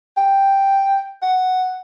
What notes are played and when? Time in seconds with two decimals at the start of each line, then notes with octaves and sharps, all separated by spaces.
0.17 G5
1.22 F#5